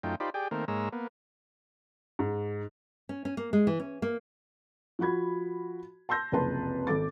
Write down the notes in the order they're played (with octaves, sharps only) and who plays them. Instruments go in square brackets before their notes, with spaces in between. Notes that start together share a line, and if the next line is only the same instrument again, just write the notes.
[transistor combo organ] F#2 A3 D#4 F4 G5
D#4 F4 G4 C5 D5 B5
G4 G#4 D5 G5
D#3 A3 A#3 C4 A#4
G#2 G#3 A#3 C#5 A#5 E6
A#3 B3
[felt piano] G#2
[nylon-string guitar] C#4
C#4
A#3
G#3
E3
C#4
A#3
[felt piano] F3 F4 F#4 B5 G#6
A5 C6 E6 G6 A#6
F#1 C2 F2 B4 A5 C6
G#1 A4 D6 A6